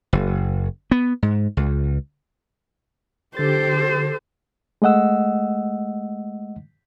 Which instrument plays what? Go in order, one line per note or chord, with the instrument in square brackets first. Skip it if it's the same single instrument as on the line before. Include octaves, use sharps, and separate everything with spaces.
[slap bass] F#1
B3
G#2
C#2
[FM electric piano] D3 A6 [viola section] G4 A4 [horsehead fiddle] C5
[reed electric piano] G#3 A3 D#5 F#5 E6